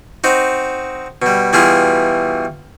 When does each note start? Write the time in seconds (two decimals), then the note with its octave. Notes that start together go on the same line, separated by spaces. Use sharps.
0.24 C4 D#4 F#4
1.22 B2 G3
1.53 B2 E3 G3 E4 F4 G#4